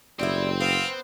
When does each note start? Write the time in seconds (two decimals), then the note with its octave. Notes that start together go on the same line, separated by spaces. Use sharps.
0.19 F#1 G3 B3 E4 C5 G5
0.61 B3 C4 F5